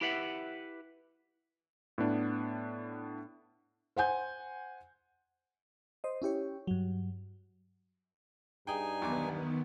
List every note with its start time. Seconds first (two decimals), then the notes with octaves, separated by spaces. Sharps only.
0.01 E4 G4 B4 E5 F#5
1.98 A2 B3 D4
3.96 C5 F#5 G#5 G6
6.04 C5 D#5
6.22 C#4 E4 G4 C#5
6.67 G2 F#3
8.67 G2 D#4 G#4 G5 G#5
9.02 B1 E2 D#3 B3 D6